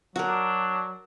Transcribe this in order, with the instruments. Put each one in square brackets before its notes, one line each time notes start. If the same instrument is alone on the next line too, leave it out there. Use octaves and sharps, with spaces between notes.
[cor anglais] F#3 [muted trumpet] D4 [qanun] F#4 A#4